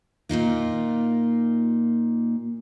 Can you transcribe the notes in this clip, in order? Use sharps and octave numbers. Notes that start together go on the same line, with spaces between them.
A#2 A#3 D#4 F4